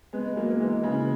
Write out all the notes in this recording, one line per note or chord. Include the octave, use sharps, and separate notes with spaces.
G#3 B3
B3
F#3 A#3
A#3
E3 G#3
C#3 E3